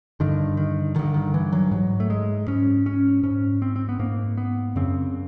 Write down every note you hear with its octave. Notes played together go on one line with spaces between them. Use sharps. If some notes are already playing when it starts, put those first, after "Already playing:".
G2 D3 D#3
D#3
G2 D3 D#3
D#3
E3
F#3
G#2 F#3
A3
G#3
G#2 C#4
C#4
G#2 C#4
C4
C4
B3
G#2 A#3
B3
F#2 C#3 C4